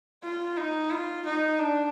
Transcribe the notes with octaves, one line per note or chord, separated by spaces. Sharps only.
F4
D#4
F4
D#4
D4